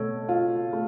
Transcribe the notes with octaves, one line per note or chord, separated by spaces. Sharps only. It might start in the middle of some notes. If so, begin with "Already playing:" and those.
Already playing: B2 A3 A4 C#5
F4
A3